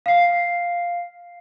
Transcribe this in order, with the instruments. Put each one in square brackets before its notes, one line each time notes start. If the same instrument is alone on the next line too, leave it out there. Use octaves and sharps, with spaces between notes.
[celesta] F5 C7